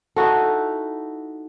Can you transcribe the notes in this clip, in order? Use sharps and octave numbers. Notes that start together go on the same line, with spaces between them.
D#4 E4 F#4 A4